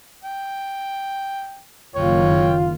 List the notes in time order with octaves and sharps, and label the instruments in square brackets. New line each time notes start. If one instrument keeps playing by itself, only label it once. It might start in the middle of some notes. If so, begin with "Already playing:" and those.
[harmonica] G5
[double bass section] F#1 D#3 [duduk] F4 [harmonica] C#5 G5